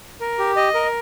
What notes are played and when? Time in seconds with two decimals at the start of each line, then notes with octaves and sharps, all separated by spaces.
0.21 A#4
0.39 G4
0.56 D#5
0.74 A#4